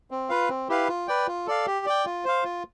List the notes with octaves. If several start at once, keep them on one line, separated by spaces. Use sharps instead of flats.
C4
F4 B4 F5
C4
E4 G4 B4 F5
F4
B4 D5 G5
F4
A4 D5 F5
G4
D5 G5
F4
C5 F5
F4